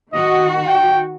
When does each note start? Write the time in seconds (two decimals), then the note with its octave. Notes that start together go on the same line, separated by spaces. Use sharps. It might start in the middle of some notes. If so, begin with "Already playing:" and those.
0.13 D#3 F#4 D#5
0.68 G5